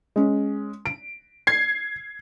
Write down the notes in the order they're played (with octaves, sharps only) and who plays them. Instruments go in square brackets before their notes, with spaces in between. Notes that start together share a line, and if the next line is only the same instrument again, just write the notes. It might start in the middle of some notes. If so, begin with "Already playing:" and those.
[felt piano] G#3 C#4
D7
[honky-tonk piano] G#6 C7